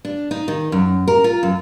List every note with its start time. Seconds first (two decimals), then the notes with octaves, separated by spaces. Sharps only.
0.05 D4
0.31 D#4
0.48 D#3
0.72 F#2
1.08 A#4
1.24 F4
1.43 F#2